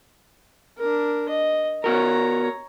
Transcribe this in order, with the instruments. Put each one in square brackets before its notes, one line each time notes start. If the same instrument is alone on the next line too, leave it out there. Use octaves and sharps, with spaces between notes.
[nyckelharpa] D4 A#4
D#5
[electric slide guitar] B3 F#4 A#4 [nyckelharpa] C#5 A#5